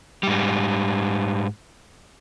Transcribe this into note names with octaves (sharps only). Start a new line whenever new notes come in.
G#2 G3